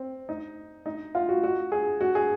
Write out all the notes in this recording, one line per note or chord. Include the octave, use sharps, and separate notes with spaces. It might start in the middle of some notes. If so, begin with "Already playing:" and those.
Already playing: C4
D#4
D#4
F4
F#4
F#4
G#4
F#4
G#4